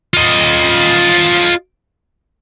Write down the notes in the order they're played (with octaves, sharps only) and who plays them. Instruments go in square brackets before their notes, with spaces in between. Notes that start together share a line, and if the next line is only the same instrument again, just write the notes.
[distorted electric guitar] F4 D#5